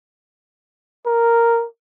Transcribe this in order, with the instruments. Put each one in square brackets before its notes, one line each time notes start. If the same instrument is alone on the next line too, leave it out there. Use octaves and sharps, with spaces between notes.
[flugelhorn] A#4